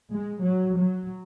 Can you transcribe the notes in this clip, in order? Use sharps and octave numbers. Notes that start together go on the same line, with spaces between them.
G#3
F#3
F#3